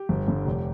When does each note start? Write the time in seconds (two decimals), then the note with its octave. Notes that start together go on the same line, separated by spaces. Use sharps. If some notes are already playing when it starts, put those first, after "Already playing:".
Already playing: G4
0.09 G1
0.27 G2 D3
0.45 F1